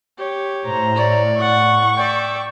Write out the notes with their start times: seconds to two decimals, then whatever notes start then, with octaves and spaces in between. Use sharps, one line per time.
0.18 G4 C#5
0.64 A2 C5 A#5
0.96 C#5 D5
1.39 F#5 C#6
1.96 D5 E5 G5